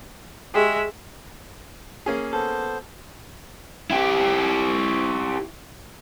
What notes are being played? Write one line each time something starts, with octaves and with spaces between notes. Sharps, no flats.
G#3 G4 G#4 E5 G5
A#3 C#4 G#4
B3 A4 C5
E4 G4